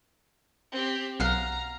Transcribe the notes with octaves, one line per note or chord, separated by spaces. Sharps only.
C4 G4
B1 F5 F#5 A#5 F6